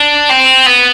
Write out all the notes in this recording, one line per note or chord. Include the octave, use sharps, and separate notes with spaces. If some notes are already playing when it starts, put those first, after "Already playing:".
Already playing: D4
C4
B3